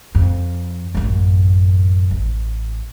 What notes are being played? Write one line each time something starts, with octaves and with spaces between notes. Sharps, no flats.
F2
A1 F#2
A1